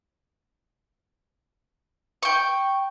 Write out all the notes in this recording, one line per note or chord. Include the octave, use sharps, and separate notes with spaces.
G5 C#6